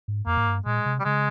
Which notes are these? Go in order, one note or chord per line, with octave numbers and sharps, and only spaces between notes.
G#2
F2 A#3
G#2
G2
A#2 G#3
C3
G3
C#3 G#3